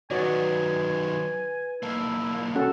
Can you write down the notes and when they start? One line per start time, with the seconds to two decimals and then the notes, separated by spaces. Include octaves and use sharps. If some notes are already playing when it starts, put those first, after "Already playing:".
0.11 D#3 F#3 F#4 B4 C#5 D5 G#5
1.83 B1 A#3 E4 A5
2.55 C#4 F#4 A4 F#5